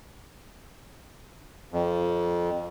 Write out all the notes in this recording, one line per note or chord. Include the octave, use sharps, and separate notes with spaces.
F2